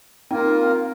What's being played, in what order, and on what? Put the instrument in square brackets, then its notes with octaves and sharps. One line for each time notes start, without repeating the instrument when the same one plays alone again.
[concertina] A#3 F4 A#4 [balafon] C4 D#4